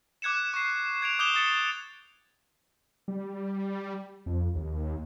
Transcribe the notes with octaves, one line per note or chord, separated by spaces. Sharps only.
D6 F#6 G#6 C#7 E7
C#6 C7
G#6 D7 F7
D6 D#6 G6 E7 F7 G7
D#6 A6 C#7 G7
G3
F2
D#2